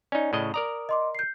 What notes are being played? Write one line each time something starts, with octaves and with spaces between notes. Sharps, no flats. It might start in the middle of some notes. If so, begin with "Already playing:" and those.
C#4 D#4 D5
A2 C#3 D#5
A#4 D5 A#5 D#6
D#5 C6 D6
G6 C7